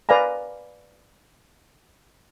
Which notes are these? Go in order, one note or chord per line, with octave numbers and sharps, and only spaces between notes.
B4 D5 F5 G#5 A#5